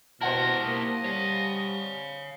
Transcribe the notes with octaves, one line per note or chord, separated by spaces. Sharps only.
B2 E4 G4 A#4 C5 F#5 A5
A#3 D#5
G3 C#5 F5